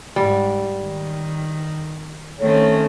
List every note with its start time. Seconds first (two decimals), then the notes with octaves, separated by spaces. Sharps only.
0.16 G#2 G3
0.81 D#3
2.41 D#3 A3 C4 C#4 C#5